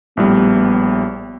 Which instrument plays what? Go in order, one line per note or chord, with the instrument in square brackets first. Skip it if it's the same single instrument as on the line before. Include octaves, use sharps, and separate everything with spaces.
[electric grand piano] A#1 A2 G3 [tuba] B3